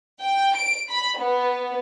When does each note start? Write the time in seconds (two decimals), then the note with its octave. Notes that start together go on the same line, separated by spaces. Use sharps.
0.22 G5
0.57 D7
0.90 B5
1.19 B3